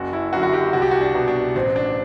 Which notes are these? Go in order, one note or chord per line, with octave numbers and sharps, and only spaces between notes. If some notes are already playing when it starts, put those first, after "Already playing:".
Already playing: F#1 F#4
E4
F#2 D3 F#4
F#4
G4
C2 F#4
G4
F#4
D4
B2
D4
A1 C4
D4